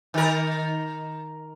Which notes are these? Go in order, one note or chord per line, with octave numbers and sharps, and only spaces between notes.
D#3 A#4